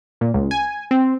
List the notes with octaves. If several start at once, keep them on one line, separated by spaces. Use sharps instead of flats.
A#2
C#2
G#5
C4